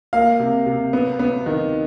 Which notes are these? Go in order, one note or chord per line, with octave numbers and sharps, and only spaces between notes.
A#3 F5
C3
C3
B3
B3
D#3